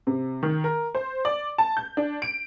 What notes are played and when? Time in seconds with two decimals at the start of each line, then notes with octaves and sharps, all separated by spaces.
0.07 C3
0.43 D#3
0.64 A#4
0.95 C5
1.25 D5
1.58 A5
1.77 G6
1.97 D4
2.22 D7